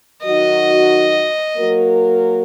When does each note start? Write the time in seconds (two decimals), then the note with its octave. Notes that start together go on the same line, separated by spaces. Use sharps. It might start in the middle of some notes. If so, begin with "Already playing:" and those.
0.24 D#3 F#3 D#4 F#4 D#5
1.57 F#3 A#3 F#4 A#4